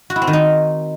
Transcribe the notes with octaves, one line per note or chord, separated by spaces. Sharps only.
F#4
E4
C4
D#3
D#4